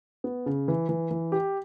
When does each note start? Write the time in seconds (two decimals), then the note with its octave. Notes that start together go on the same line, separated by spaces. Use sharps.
0.24 B3
0.46 C#3
0.68 E3
0.89 E3
1.11 E3
1.32 G4